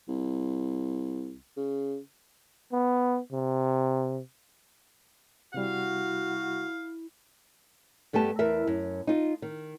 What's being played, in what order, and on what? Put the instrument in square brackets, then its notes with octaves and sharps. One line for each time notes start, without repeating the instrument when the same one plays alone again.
[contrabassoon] C2
C#3
[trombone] B3
C3
[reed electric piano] C3 G3 [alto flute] E4 [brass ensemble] F#4 [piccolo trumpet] F5
[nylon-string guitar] G2 A3 B3 G4 A5
E2 A#4 E5
F#2
D#4 F4
D#3